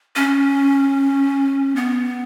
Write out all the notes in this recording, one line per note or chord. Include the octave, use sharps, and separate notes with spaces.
C#4
B3